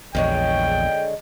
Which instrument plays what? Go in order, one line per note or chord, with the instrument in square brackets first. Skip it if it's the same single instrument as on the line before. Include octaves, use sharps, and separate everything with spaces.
[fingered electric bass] A#1 E2 [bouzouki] D3 G#3 C#5 [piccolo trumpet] G5